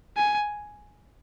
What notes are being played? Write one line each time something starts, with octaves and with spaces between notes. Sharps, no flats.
G#5